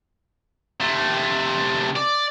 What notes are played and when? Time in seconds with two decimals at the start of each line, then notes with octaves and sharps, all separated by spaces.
0.81 C3 A3
1.96 D5